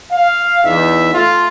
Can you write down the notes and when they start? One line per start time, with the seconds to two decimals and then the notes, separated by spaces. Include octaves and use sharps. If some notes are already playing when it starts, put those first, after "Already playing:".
0.12 F5
0.65 E2 D#4 E5
1.13 A3 F4